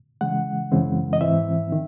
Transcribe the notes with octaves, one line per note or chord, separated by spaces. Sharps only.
C#3 E3 G#3 F#5
F#2 C#3 E3 G#3 C4
D#5
G#2 E3 C4 E5
D#3